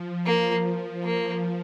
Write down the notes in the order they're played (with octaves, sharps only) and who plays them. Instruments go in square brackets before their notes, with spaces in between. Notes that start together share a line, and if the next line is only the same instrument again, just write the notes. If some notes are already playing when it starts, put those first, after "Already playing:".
Already playing: [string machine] F3
[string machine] F3 [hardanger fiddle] A#3
[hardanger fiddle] A#3